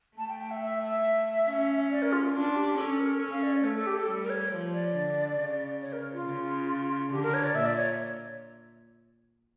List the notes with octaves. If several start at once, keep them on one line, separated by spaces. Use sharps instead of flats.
A3 A5
G5
G5
E5
E5
E5
C#4
D5
A#4
F4
F4
D4 F4
G4
C#4 A4
A#4
C#4 A4
F5
D5
C#5
A3 A4
A4
G4
A4
G3
A#4
C#5
F3
D5
D3
C#3
C#5
A#4
F4
C#3
D3 G4
A#4
C#5
D5
A#2 E5
D5
C#5